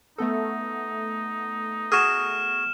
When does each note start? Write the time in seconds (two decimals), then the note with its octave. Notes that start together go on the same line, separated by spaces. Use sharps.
0.18 A3 B3 D#4 A4
1.92 F#4 G#4 F6 E7